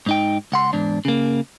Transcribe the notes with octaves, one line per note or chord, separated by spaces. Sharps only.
G#2 D#4 G5
C#2 F#5 C6
E2 G#2 D4
C#3 A#3